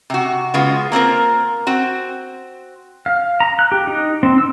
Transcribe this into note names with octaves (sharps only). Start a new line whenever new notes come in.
C3 F#4
C#3 G#3 B3 F4
A#3 C4 F4 A#4
C4 F#4
F5
A#5
F#6
G4
D#4
C4
E6